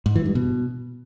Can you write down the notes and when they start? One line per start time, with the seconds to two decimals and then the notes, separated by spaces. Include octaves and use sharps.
0.06 G#2
0.16 E3
0.25 G2
0.35 B2